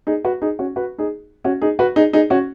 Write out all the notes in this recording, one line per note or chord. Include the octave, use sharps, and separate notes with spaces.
D#4 G#4
F#4 B4
D#4 G#4
C#4 F#4
F#4 B4
D#4 G#4
C#4 F#4
D#4 G#4
F#4 B4
D#4 G#4
D#4 G#4
C#4 F#4